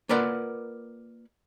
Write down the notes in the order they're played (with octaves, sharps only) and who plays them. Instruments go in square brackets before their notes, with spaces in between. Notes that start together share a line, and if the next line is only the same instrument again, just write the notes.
[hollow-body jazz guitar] A#3 F4 A#4 B4 D5 F#5